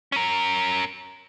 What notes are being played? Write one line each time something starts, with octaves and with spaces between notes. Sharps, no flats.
C#4 A#4